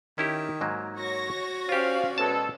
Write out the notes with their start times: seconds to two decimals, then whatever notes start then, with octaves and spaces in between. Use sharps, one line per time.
0.18 D#3 C#4 E4 G4
0.61 G#2 F#3 A#3
0.98 F#4 C#5 C#6 A#6
1.69 C#4 F4 G4 C5 D5 F5
2.18 B2 G#3 A4 A5